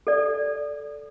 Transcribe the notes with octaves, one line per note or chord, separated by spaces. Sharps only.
A4 D5